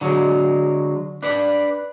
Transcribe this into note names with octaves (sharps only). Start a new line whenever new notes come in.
D3 F#3 G#3
D4 B4 D5